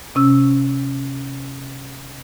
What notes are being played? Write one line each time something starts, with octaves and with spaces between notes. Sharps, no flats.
C3 C#4 E6